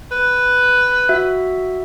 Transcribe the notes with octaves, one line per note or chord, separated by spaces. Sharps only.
B4
F#4 E5